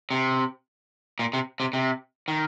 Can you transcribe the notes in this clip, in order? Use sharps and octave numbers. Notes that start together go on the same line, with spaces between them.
C3
A#2
C3
C3
C3
D#3